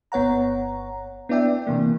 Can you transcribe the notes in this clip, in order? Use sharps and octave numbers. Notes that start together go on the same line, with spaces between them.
G1 B3 C#5 F#5 A#5
B3 D4 E4 D5 E5 G5
C3 E3 A#3